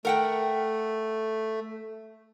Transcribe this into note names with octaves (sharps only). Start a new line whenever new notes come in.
A3 A#4 F#5 G5